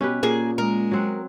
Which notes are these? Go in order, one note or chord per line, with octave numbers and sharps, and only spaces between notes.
B2 C#4 G4 B4
A#2 A#3 G#4 G#5
G#3 A#4
F#3 C4 F#5